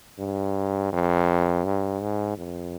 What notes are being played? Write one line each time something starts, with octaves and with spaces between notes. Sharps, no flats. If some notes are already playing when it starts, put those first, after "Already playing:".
G2
F2
G2
G#2
F2